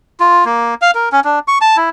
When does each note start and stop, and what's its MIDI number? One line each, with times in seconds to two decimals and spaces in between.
0.20 0.45 65
0.45 0.74 58
0.82 0.91 77
0.95 1.09 70
1.12 1.20 61
1.24 1.39 62
1.48 1.58 85
1.61 1.77 81
1.77 1.90 64